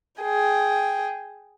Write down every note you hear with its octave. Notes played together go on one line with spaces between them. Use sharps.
G#4 G5